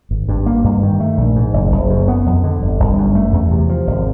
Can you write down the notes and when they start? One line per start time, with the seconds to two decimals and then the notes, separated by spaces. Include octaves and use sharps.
0.11 G#1
0.29 G2
0.46 A#3
0.64 G2
0.83 D#3
1.00 A3
1.17 A#1
1.36 G#2
1.53 F#1
1.72 F#1
1.89 F#2
2.08 B3
2.26 F2
2.44 D3
2.62 G1
2.80 G1
2.97 F#2
3.15 A3
3.33 E2
3.51 C3
3.69 F3
3.87 G#1